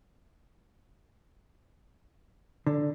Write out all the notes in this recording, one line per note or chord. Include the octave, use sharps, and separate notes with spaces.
D3